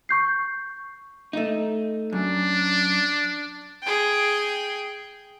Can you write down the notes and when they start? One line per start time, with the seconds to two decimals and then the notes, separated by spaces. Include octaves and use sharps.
0.09 C#6 G6 C7
1.33 A3 D#4
2.13 F#2 D4
3.83 G#4 G5